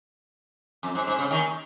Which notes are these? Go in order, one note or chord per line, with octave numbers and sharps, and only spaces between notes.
F2
G#2
G#2
C#3
D#2 D#3